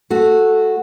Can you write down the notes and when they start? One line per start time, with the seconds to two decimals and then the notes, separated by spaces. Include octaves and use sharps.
0.10 A3 F#4